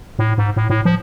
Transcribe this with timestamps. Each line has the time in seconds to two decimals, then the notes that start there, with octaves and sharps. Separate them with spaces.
0.19 A2
0.38 G#2
0.56 A2
0.70 A2
0.85 F3